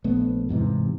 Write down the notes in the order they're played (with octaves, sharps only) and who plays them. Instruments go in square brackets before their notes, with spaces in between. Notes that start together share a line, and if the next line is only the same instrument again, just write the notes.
[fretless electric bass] A#1 A3 B3
E2 G#2 C3 E3